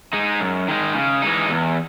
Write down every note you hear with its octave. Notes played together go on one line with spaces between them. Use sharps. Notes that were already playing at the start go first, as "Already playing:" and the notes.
G#3 D#4
F#2
D#3 G#3 D#4
C#3
E3 G#3 D#4
E2